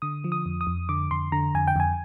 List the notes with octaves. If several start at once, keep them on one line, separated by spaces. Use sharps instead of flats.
D3 D#6
F3
D#6
F2
D#6
F2
D3 D6
F2 C6
D3 A#5
F2 G#5
G5
F2 G#5